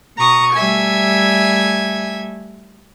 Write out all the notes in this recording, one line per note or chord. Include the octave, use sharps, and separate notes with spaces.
B2 A#5 C#6 D#6
G3 A3 E5 G#5 G#6